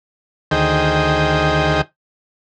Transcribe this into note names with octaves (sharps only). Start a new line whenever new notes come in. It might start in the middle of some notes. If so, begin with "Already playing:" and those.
D2 D#3 G#4 C5 D#5 G5